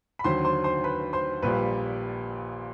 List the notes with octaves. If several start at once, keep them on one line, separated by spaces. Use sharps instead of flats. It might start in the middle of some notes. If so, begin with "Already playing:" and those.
B5
D#2 D3 F#3 C5 C6
C5 C6
C5 C6
B4 B5
C5 C6
A#1 A#2 G3 B4 B5